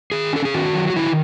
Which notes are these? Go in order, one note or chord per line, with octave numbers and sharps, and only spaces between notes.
D#3 G#4
C#4 A4
G#4
D#3 F#4
F#3
F#4
D#3 E4